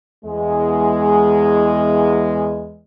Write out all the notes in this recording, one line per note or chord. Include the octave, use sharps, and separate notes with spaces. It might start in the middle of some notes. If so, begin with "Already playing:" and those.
E2 G#3